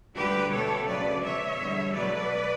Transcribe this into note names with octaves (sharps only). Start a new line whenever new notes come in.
D2 D3 G3 G4 B4
B2 A3 A4 C#5
D2 C#3 F#3 B4 D5
B2 A3 C#5 E5
E2 D3 G3
B2 F#3 A3 B4 D5